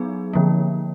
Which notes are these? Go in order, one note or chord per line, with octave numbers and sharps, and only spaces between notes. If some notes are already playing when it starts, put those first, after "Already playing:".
Already playing: F#3 B3 D#4 G#4
D3 F3 A#3